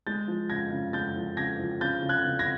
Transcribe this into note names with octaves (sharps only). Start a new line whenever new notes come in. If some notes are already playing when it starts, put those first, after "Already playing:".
G#3 G6 A6
F3
C#3 G#6 A#6
C#3
G#3 G6 A6
F3
C#3 G#6 A#6
F3
C#3 G6 A6
C#3
F#6 G#6
C#3
G#6 A#6